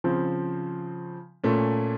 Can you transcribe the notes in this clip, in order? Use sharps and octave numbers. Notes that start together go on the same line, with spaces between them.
C#3 F3 C4
A#2 A3 C#4